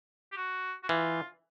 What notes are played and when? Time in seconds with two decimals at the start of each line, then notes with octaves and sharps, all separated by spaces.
0.32 G4
0.37 F#4
0.83 F#4
0.89 E3 F4